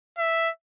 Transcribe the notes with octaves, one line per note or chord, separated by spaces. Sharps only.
E5